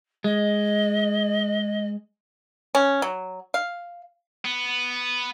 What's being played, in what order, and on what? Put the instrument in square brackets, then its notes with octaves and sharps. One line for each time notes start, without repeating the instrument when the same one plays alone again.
[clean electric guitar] G#3 [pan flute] D#5
[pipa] C#4
F#3
F5
[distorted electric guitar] B3